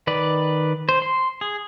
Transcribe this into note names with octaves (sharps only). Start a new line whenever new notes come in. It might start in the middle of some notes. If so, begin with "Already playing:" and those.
D#3 B4 D5
C5
C6
G#4